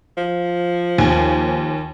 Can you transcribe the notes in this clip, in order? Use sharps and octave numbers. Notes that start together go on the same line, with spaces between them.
F3
D#2 G#5